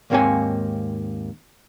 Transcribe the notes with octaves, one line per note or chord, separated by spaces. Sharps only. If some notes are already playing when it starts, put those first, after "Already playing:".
D#2 G#2 A#3 C4 C#5 G#5